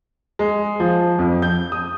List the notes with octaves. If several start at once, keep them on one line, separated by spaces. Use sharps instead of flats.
G#3
F3
F2
G6
D#6